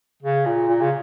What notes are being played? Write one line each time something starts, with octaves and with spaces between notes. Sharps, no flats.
C#3
A#2
A#2
C#3